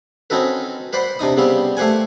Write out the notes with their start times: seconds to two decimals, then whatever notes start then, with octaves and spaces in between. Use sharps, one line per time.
0.30 C4 C#4 D#4 F#4 A4 B4
0.93 B4 C5 D5 F#5 B5 C6
1.19 C3 D4 D#4 D#6
1.37 C#3 G3 B3 C4 G4
1.77 A3 G4 C5 F#5 G#5